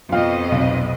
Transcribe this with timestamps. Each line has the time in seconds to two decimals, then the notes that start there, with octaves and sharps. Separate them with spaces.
0.12 F2 B2 F4 D#5 F5 G5
0.52 F1 B1